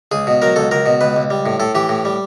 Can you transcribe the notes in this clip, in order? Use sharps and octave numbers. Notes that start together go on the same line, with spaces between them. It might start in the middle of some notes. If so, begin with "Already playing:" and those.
C#2 G#4
B2
F#3 A#4
C#2 A4
C#2 A#4
B2
C#2 B4
C#2
G3
A2
A2 A4
E3 G4
A2
G3